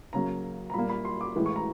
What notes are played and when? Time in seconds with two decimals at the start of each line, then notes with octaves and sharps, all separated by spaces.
0.13 C#3 F#3 A#3 A#5
0.70 A#5
0.74 A#2 G3 A#3 B5
0.90 B5
1.05 C6
1.21 D6
1.35 A2 E3 G#3
1.46 C#6
1.56 A#5